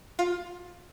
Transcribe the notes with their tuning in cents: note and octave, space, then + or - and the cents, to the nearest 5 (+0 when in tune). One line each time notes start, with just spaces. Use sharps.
F4 +15